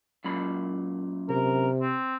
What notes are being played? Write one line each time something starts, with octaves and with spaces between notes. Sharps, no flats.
F#2 A#2 B5
C3 A#4
C4